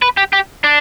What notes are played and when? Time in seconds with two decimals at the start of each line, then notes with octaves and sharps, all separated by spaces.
0.02 B4
0.17 G4
0.33 G4
0.64 D4